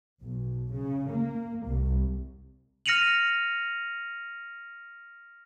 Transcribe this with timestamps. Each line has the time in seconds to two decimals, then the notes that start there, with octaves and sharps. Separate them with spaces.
0.23 B1
0.72 C#3
1.10 A#3
1.67 C2
2.86 F6 A#6 C#7 D#7 F7 F#7